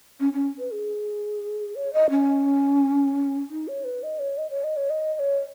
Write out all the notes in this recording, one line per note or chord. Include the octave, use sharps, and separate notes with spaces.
C#4
C#4
B4
G#4
C#5
D#5
C#4
D#4
C#5
B4
D#5
C#5
D#5
C#5
D#5
C#5
D#5
D#5
C#5